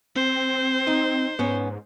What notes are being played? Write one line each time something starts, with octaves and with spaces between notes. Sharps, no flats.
C4 C5
D#4
G#2 B3 C#4